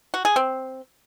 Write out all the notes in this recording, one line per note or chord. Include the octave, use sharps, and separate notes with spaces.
F#4
G#4
C4